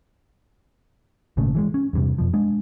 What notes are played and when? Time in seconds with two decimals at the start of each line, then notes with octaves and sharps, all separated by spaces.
1.37 G#1 A#2 C#3 A3
1.55 E3 F#3 G#3
1.74 C#4
1.93 E2 G2 C3
2.18 F2 B2 F3
2.33 G#3 D4